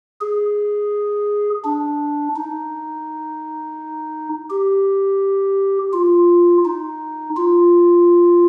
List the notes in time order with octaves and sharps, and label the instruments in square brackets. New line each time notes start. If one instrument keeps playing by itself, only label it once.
[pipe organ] G#4
D4
D#4
G4
F4
D#4
F4